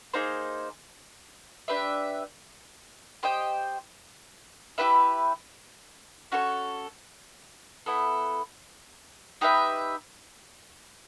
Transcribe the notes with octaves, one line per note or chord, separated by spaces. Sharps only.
A#3 D#4 G#4 C5
D4 G4 B4 E5
G4 C5 D#5 G5
E4 G4 B4 E5
C#4 F#4 A4 C#5
B3 E4 A4
D#4 G4 B4 E5